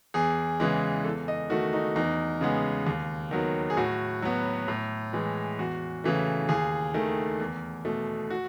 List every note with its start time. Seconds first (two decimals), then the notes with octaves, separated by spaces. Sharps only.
0.14 E2 G#4
0.60 C#3 E3 G#3
1.05 E2 A4
1.28 D#5
1.50 D#3 A3 F#4
1.73 D#4
1.96 E2 D#4
2.41 C#3 G#3 B3
2.87 D#2
3.31 D#3 F#3 B3
3.70 G#4
3.77 A2 F#4
4.22 F#3 B3
4.68 A2
5.13 E3 G#3
5.59 E2 F#4
6.04 C#3 E3 A3
6.49 D#2 G#4
6.94 D#3 A3
7.40 E2
7.85 B2 A3
8.30 F#4